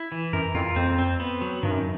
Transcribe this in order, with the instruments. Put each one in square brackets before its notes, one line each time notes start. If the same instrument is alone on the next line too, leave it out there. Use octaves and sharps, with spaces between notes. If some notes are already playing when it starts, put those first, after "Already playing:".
Already playing: [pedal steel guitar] E4
E3
[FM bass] F#2 [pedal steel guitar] A#4
[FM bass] F2 [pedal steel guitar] F4
[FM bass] F2 [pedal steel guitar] C4
[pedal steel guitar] C4
B3
F#3
[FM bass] G2 [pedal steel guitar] D#3
[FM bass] F#2